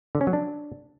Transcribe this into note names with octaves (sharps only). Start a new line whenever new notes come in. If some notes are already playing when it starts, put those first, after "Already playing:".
D3
C#4
F#3
D4